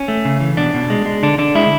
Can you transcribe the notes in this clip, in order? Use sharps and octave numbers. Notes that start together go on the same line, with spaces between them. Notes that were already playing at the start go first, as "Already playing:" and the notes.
Already playing: C#4
A3
C#3
E3
B2 D4
B2
G#3
G#3
D3 D4
D3 D4
G#3 E4